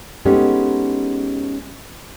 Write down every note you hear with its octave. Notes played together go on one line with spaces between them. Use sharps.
G#3 B3 C#4 D#4 G4 A4